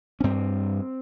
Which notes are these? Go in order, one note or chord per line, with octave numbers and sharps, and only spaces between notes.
C#4
G2 C4